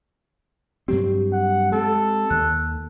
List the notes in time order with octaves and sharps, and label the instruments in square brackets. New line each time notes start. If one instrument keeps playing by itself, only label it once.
[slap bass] G2 F#3 C4 [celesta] G4
[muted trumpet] F#5
[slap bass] G#3 C4 [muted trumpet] A4
[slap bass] D#2 [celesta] F#6